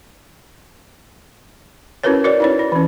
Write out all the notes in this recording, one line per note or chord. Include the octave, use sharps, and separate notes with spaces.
C#4 E4 F#4 A#4 B4 C#5
F#4 A#4 C#5 D5
D#4 E4 C#5
E4
E3 C#4